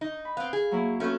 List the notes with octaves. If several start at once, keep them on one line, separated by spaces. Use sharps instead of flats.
D#4
B5
B3 C4 F5
G#4
F#3 A#3 E4
A3 B3 C#4 F#4